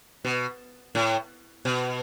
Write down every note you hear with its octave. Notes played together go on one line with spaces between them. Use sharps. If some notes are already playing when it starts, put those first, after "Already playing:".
B2
A2
B2